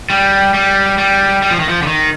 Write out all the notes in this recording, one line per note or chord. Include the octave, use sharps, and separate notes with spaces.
G3
G3
G3
G3
F3
D#3
F3
D3
D#3